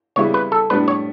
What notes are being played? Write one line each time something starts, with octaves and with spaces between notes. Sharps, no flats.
C#3 E3 G3 B3 E4 C#5
B4
A4
A2 G3 B3 D4 B4
C#5